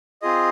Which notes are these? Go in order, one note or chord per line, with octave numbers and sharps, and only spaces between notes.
C4 F4 G#4 D#5